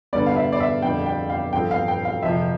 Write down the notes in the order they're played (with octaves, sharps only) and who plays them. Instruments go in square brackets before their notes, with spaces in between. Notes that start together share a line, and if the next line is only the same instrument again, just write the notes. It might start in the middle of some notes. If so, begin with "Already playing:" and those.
[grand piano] G2 D3 G3 B3 [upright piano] D5
[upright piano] F5
E5
D5
E5
[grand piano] F2 D3 G3 [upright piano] G5
[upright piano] G5
F5
[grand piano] G2 F3 C4 F4 A4 [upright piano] G5
[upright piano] F5
G5
F5
[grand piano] F2 C3 F3 [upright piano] E5